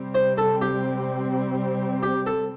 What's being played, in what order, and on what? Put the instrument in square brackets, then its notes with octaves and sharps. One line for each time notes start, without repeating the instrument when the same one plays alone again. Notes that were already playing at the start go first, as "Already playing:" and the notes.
Already playing: [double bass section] C3 G3 C4
[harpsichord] C5
A4
G4
G4
A4